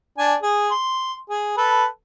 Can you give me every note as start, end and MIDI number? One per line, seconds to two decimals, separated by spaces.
0.18 0.34 62
0.18 0.34 80
0.42 0.70 68
0.71 1.14 84
1.29 1.52 68
1.57 1.85 69
1.57 1.85 71